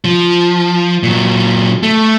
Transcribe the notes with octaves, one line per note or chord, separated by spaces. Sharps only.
F3
A#2 F#3
A3